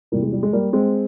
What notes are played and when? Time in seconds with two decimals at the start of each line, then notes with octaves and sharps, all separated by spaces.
0.12 E2 C3 E3 G3 A#3
0.22 G#3
0.32 G3
0.43 G#3
0.53 G3 A#3
0.73 G#3 C4